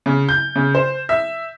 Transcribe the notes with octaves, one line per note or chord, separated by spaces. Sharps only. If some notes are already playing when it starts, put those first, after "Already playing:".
C#3
G6
C#3
C5
E5